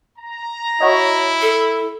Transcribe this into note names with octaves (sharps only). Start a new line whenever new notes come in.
A#5
E4 F#4 C#5 D#5
A4